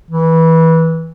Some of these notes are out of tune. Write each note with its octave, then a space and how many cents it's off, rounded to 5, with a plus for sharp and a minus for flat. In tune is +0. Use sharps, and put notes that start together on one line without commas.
E3 -20